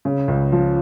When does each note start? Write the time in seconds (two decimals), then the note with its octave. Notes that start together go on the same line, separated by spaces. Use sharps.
0.05 C#3
0.28 C#2
0.52 F3